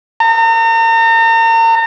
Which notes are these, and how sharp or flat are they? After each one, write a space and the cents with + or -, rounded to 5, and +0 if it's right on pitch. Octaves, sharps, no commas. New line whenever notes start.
A#5 -40